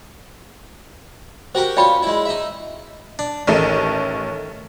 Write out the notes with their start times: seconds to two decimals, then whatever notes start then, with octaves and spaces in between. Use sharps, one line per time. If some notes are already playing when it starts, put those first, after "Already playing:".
1.55 F#4 G4 A#4 C5
1.77 C#4 F4 D5 G5 B5
2.03 G#3 E4
2.25 D#4 E5
3.19 D4
3.48 A1 D#3 A3